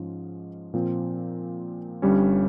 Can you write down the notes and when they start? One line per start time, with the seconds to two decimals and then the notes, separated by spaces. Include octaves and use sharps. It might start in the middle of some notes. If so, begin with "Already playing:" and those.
Already playing: G#2 F3 G#3 C#4
0.74 A#2 F3 C4
2.02 G1 G2 G3 C#4